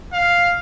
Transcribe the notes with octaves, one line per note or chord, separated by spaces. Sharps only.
F5